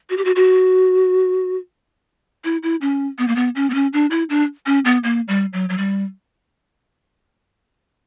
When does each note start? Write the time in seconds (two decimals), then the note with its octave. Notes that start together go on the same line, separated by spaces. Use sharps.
0.10 F#4
0.17 G4
0.25 F#4
0.36 F#4
2.44 E4
2.63 E4
2.81 C#4
3.19 B3
3.28 A#3
3.36 B3
3.56 C#4
3.70 B3
3.74 C#4
3.93 D4
4.11 E4
4.30 D4
4.66 C#4
4.85 B3
5.04 A#3
5.28 G3
5.53 F#3
5.69 F#3
5.78 G3